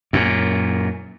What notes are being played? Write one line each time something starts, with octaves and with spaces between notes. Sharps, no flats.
F#2 A#2